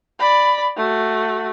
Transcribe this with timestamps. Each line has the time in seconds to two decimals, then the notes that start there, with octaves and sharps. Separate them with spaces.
0.19 D5 B5
0.77 A3 F#4